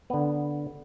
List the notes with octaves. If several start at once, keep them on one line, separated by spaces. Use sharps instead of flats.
D3 B3